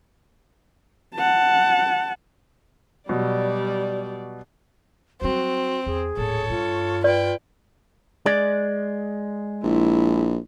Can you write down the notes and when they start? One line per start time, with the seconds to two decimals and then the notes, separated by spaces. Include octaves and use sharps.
1.15 F#5 A5
3.09 B2 F#3 G3 D5
5.22 F#3 G3 C4 F#4
5.86 E2 G#4
6.17 D#1 A2 A4 C#5
6.49 G2 F4
7.04 B4 D5 G5
8.26 G#3 D5
9.64 A#1 E4